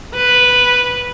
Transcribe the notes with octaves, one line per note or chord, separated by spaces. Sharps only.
B4